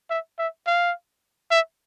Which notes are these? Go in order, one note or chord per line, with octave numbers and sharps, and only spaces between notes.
E5
E5
F5
E5